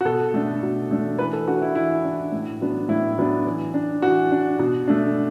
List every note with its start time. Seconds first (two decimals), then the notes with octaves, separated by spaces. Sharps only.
0.01 F#4
0.05 B2 A4
0.34 A3 D4
0.63 B2
0.91 A3 D4
1.19 E3 B4
1.33 A4
1.48 D4 F#4
1.62 E4
1.75 E3 E4
2.04 D4
2.32 A2
2.61 F#3 B3 D4
2.89 A2 E4
3.18 F#3 B3 D4
3.46 E3
3.74 D4
4.02 E3 F#4
4.32 D4
4.59 B2
4.88 A3 D4